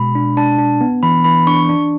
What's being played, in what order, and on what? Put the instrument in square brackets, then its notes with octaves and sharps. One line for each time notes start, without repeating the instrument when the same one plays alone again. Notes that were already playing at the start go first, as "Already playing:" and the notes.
Already playing: [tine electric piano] B2 G#3 [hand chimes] B5
[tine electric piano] D4
[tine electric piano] D4 [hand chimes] A5
[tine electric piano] D4
B3
[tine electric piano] E3 [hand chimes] B5
[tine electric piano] E3 [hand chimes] B5
[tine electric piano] D4 [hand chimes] C#6
[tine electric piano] D4